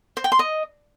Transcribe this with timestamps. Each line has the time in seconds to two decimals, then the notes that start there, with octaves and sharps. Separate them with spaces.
0.17 C5
0.24 G5
0.32 C6
0.39 D#5